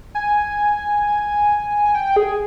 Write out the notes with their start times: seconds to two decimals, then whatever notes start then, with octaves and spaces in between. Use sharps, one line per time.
0.15 G#5
1.85 G#5
1.95 G5
2.16 G#4